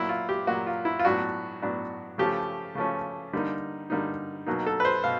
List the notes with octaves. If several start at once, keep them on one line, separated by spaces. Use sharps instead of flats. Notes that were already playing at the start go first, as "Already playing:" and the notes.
Already playing: A#2 F#3 A#3 E4
F4
G4
A#2 F#3 A#3 F#4
F4
E4
F4
A2 F#3 B3 D4 F#4
A2 F#3 B3 D4
C#3 F3 A3 C#4 G4
C#3 F3 A3 C#4
D3 G3 A#3 D#4
D3 G3 A#3 D#4
B2 F#3 A#3 D#4
A4
B4
C5
B2 F5